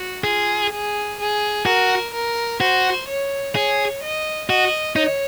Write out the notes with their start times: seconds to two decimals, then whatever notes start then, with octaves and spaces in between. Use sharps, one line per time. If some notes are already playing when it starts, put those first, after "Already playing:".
Already playing: F#4
0.24 F4 G#4
0.72 G#4
1.19 G#4
1.66 F#4 A#4
2.13 A#4
2.60 F#4 C5
3.08 C#5
3.55 G#4 C#5
4.02 D#5
4.49 F#4 D#5
4.96 D#4 C#5